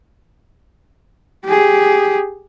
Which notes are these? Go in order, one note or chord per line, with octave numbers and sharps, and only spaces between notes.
G4 G#4